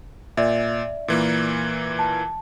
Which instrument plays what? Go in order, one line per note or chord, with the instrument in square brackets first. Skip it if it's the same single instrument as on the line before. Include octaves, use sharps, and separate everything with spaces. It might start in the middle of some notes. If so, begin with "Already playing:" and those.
[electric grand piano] A#2 [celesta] D5 E5
[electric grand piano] A#2 E3 A#3
[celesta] A5